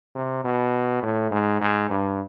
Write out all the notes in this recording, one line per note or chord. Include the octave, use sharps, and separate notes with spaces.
C3
B2
A2
G#2
G#2
G2